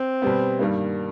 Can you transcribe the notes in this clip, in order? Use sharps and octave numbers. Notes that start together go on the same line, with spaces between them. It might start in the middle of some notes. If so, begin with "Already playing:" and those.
Already playing: C4
B2 G3 B3
G2 D#3 G3 A#3